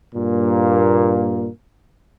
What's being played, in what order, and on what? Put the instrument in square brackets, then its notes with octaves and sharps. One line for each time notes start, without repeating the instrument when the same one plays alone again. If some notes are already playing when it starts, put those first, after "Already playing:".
[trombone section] G2 A#2 A#3